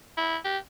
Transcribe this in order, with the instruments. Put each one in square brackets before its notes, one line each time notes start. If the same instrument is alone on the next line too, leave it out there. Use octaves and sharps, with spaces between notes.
[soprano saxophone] E4
G4